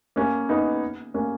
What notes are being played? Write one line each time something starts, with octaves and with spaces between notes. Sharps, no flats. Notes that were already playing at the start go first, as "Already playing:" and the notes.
A#3 C#4
B3 D#4
A#3 C#4